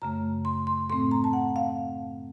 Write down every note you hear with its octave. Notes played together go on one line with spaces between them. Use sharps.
F#2 C#3 A3 A#5
C6
C6
A2 A3 C4 C6
A#5
A5
F#5
F5